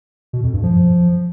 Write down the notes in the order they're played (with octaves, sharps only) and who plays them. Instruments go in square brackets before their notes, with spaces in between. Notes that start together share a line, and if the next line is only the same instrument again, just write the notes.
[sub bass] B2
F2
G2
F3